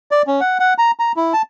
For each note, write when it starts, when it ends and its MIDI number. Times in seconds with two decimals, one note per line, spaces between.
0.11 0.22 74
0.27 0.41 61
0.41 0.58 78
0.60 0.74 78
0.78 0.91 82
0.99 1.12 82
1.16 1.33 64
1.33 1.42 81